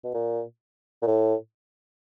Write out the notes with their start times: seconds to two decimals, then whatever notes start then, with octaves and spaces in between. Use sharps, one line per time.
0.04 B2
0.14 A#2
1.02 A#2
1.07 A2